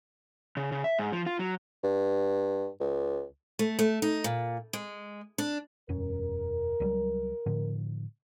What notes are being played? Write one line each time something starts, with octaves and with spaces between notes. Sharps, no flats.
C#3
C#3
E5
G#2
F3
F4
F#3
G2
C#2
A3
A3
D#4
A#2
G#3
D4
E1 F#2 C#4 A#4
C#2 F#3 G3
A2 D3 F3